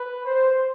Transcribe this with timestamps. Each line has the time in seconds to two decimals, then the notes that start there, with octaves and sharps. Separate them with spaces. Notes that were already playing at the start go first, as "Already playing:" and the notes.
Already playing: B4
0.26 C5